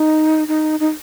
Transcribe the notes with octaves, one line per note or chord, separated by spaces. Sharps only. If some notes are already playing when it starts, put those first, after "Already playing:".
Already playing: D#4
D#4
D#4